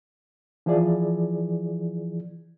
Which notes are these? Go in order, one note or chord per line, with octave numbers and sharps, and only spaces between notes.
E3 F3 E4 G#4 D5